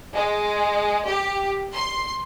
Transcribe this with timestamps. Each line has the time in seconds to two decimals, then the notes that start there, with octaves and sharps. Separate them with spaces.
0.14 G#3
1.06 G4
1.74 C6